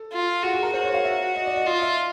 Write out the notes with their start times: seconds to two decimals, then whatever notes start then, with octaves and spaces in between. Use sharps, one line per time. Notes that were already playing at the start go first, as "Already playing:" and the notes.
Already playing: A4
0.12 F4
0.43 F#4 G#4
0.54 G#4
0.63 A#4
0.73 F#4 C5
0.83 C#5
0.94 F5
1.04 E5
1.36 D#5
1.46 D5
1.56 D#5
1.66 F4 D#5
1.82 E5